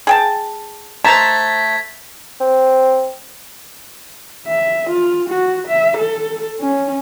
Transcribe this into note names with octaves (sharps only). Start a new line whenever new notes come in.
G#4 G5 A5
A3 C5 A5 A#5 G#6 A6 B6
C4
E5
F4
F#4
E5
A4
C#4